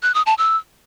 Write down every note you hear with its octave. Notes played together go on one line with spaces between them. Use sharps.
F#6
D#6
A5
E6